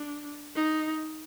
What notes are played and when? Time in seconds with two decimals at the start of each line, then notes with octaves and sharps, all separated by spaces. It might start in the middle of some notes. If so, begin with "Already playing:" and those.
Already playing: D4
0.56 D#4